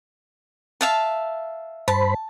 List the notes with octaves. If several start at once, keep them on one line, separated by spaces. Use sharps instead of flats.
E5 F5 A5
G2 C5 A5 B5